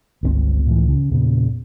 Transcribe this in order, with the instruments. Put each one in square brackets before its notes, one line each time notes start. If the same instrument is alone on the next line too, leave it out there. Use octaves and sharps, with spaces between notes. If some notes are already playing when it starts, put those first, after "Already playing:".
[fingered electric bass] G1 D3 C4 [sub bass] C#2
[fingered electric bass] A2 E3
C#3
[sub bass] E2 [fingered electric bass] A#2 C#3